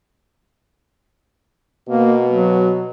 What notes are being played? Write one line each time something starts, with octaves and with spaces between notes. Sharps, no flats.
B2 A#3
F#3